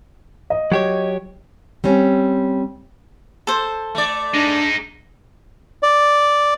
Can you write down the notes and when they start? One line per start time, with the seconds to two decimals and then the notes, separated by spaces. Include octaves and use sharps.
0.50 D#5
0.72 F#3 G4 C#5
1.84 G3 C4 C#4
3.47 A4 C5
3.95 A3 D5
4.34 G#3 D4 D#4
5.83 D5